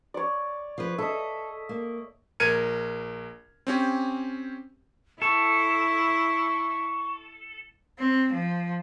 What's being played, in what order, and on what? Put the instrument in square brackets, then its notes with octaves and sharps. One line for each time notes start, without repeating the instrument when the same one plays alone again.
[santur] C#5 D5
[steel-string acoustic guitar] F3 B4
[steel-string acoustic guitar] A4 [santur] D#5 E5
[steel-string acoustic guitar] A#3
[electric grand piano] A#1 A#4 F6 G#6 C#7 D#7
C4 C#4 G4
[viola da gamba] E4 [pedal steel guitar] A4 [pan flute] C#6
[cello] C4
F3